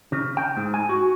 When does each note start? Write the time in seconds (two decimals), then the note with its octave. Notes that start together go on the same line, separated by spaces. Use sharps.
0.12 C#3
0.37 G5
0.57 G#2
0.74 G#5
0.89 F#4